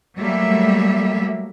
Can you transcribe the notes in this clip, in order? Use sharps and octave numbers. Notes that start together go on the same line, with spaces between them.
F#3 G3 A3 A#3 E5